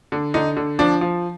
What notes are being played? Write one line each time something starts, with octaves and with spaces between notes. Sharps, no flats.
D3
D3 D#4
D3
F3 D4
F3